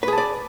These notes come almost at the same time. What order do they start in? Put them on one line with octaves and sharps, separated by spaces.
B4 G#4 A5 D5